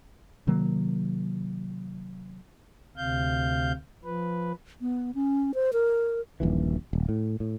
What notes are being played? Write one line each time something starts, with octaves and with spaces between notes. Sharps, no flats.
C3 D#3 F#3 A#3
D2 C3 F5 G6
F3 B4
B3
C#4
C5
A#4
D#1 A#1 E3
D#1
A2
A2